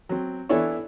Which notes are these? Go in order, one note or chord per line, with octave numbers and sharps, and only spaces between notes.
F#3 C4
E3 B3 D4 E4 A4 C#5